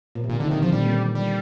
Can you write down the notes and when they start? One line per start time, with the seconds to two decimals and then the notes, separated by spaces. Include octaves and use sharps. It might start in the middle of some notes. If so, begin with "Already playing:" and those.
0.15 A#2
0.24 C3
0.29 A#2 D3
0.40 D3 D#3
0.47 C3
0.51 D3 D#3
0.62 C3 F3
0.73 A#2 G3
0.87 A#2
1.15 G3